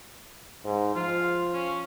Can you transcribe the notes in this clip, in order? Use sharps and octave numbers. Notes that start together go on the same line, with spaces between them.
G#2
F3 F4
C#4